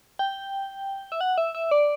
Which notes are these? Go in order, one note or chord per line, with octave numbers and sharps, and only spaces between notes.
G5
E5
F#5
E5
E5
D5